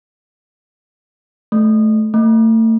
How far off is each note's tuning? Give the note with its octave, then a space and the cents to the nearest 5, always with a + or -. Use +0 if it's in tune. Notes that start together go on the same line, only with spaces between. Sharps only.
A3 -20
A3 +35